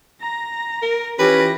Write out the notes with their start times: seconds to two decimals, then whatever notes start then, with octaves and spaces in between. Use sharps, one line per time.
0.21 A#5 A#6
0.82 A#4
1.19 E3 C#4 F4 G4 B4 A#6